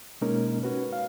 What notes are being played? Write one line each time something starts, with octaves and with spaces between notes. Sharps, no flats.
B2 G#3 A#3 C#4 D#4 A#4
C#4 F#4 B4
F5